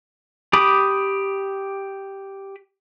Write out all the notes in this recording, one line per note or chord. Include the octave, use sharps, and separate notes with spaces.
G4 B5 D6 D#6